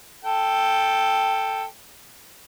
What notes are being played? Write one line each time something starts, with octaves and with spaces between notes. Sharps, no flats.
A4 G5